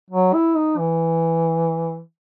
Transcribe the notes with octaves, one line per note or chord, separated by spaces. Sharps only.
F#3
E4
D#4
E3